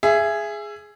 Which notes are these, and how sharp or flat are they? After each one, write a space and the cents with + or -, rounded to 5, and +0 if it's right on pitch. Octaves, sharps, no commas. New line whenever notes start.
G#4 +0 E5 +25